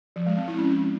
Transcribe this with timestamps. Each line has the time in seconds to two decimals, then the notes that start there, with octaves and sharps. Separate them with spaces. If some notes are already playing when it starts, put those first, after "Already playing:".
0.16 F3
0.27 G#3
0.37 C4
0.48 E4
0.58 C#4